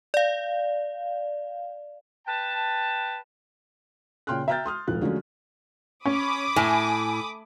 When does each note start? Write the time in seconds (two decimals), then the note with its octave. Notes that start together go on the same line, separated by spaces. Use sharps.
0.14 D5 F5
2.27 B4 G5 A5
4.27 A#2 C#3 G5 C6 F6 F#6
4.48 E5 G5 A#5 F6 G6 A6
4.65 C6 D#6 F6
4.88 D#1 F2 G#2 F3 F#6
5.02 D3 F3 F#3 G#3 A3 C#4
6.06 C#4 B5 D6 D#6
6.56 A2 G#5